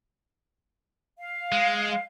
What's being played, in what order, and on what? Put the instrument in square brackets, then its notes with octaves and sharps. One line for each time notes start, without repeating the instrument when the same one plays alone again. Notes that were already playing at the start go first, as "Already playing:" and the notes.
[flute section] F5
[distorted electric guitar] G#3